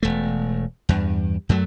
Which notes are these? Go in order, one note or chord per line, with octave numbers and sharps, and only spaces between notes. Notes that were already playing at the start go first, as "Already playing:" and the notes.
E1 A3
E2 G2
F#2 F#3 A3